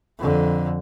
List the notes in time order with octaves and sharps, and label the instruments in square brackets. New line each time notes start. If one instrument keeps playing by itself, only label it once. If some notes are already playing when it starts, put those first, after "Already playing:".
[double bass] F2 D3